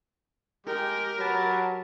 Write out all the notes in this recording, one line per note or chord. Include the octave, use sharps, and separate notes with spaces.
G#3 G4 A#4 G5
F#3 B4 A5